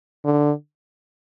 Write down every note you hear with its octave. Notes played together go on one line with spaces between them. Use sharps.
D3